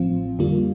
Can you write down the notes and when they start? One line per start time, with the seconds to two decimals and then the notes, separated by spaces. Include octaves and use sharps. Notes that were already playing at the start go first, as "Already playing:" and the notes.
Already playing: A1 A2 F3 C4 F4
0.39 F2 D3 G3 A#3 F4